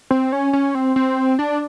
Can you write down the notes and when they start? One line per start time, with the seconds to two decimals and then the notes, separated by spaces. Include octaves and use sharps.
0.11 C4
0.32 C#4
0.53 C#4
0.75 C4
0.96 C4
1.39 D4